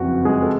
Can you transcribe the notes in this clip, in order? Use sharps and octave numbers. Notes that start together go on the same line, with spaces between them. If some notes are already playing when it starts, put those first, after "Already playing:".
Already playing: F#1 F2 C#3 E3 F#4
G#3 G#4
A4